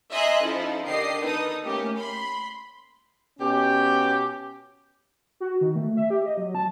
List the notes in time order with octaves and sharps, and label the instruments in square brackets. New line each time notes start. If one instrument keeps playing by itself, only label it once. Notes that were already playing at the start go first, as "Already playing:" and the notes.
[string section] D#5 E5 G#5 A#5 C6 F#6
F3 C#4 D#4 E4 A4
D3 D#3 G4 D#5 C7
D#4 A4 B4 D#6
A3 A#3 C#4 G4
B5 C6
[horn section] B2 C#4 G4
[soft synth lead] F#4
D#3
A3
E5
G4
D#5
F#3
A5